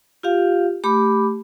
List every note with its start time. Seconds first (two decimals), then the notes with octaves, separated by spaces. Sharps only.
0.23 F4 G4 F5
0.84 A3 G4 B5 D6